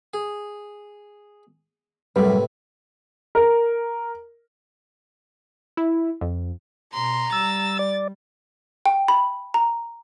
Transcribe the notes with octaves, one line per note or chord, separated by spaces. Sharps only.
G#4
F#2 A2 C3 G3 B4
A#4
E4
F2
B2 A#5 C6
G3 E6 A6
D5
G5
B5
A#5